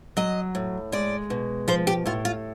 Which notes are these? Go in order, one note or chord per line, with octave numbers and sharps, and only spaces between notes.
F#3 D#5
A2
G#3 D5
B2
F3 C5
G4
A2 F4
F4